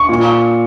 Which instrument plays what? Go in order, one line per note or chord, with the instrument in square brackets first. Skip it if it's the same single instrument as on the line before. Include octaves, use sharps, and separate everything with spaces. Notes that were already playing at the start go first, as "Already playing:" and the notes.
Already playing: [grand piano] C#6
A#2